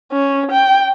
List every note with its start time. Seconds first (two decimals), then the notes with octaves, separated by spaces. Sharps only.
0.12 C#4
0.51 G5